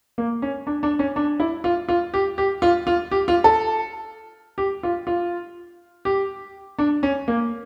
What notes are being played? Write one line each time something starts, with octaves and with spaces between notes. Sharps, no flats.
A#3
C#4
D4
D4
C#4
D4
E4
F4
F4
G4
G4
F4
F4
G4
F4
A4
G4
F4
F4
G4
D4
C#4
A#3